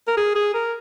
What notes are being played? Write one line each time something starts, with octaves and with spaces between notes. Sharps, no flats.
A#4
G#4
G#4
A#4